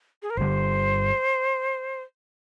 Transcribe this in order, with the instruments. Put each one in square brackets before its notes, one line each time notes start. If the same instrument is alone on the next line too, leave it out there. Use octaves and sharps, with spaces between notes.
[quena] G#4
A#4
[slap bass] G1 F2 D3 G3 [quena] C5